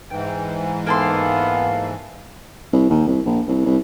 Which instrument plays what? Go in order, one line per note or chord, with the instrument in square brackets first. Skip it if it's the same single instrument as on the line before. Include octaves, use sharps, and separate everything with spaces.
[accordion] G#2 E3 [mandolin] G5
[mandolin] A#3 A4 C6 [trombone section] B3 [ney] F5
[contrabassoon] C2
D#2
C2
A#1
C2
C2